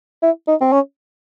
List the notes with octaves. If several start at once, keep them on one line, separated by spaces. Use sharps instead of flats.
E4
D#4
C4
C#4